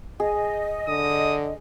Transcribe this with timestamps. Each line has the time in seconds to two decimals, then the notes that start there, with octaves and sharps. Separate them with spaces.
0.20 G#4 D#5
0.88 D3 D#6